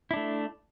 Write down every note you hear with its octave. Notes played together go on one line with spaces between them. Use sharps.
A3 D4 E4